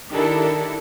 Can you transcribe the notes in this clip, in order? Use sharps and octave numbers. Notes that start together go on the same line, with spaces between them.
D#3 D4 E4 G4 A4 A#4